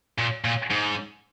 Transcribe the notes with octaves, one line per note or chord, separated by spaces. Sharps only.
A#2
A#2
G#2